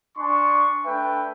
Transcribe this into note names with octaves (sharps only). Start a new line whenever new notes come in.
D4 G#5 C6 C#6
A3 D4 B4 E5 G5